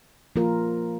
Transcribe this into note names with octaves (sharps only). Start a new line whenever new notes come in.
F3 A#3 F4 A#4